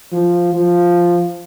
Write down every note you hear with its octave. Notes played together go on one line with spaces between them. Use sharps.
F3
F3